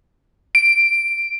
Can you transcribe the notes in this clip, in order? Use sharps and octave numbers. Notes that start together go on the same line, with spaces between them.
D7